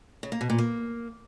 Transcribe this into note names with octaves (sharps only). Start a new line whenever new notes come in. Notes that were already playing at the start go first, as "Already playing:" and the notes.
C#3
A#3
B2
A#2
A#3